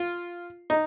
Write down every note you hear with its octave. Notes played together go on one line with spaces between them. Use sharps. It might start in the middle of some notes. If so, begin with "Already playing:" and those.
Already playing: F4
D#4